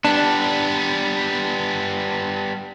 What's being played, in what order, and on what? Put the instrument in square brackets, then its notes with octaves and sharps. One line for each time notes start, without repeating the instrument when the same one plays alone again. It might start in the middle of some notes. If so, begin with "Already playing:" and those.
[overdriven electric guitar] G3 B3 [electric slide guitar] D4